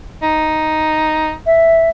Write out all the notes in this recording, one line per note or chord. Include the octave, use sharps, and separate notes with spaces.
D#4
E5